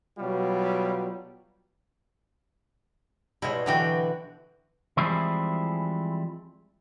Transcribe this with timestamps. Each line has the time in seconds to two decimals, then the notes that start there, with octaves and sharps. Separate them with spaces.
0.18 B2 F#3 G3 F4
3.42 B2 G3 G#3 E4 C#5
3.66 D3 E3 F#3 F#4 G4 G5
4.97 E3 F3 G3 G#3 C4 E4